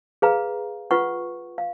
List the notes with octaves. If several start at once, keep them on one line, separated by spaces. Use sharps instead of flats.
G#4 B4 F5 A#5
F4 B4 F#5 C#6
F5